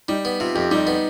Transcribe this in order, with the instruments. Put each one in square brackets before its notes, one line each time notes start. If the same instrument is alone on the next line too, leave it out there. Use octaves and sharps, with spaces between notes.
[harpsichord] G3 [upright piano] D#4
[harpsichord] B3
[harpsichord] C3 [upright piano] F4
[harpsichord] F2 [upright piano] G4
[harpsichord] G3 [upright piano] D#4
[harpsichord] B3